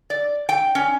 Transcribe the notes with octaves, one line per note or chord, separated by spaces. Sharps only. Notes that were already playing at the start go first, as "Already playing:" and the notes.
D5
G5
C#4